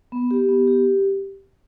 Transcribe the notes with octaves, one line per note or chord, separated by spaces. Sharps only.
B3
G4
B3
G4